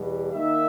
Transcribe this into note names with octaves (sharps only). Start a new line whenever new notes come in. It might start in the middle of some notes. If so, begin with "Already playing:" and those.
Already playing: E2 B2 G3
D#3 A#3 D#4 E5